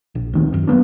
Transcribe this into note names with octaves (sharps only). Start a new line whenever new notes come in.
A#1
D2 D#3 C4
F#2
F#3 A#3 B3 D4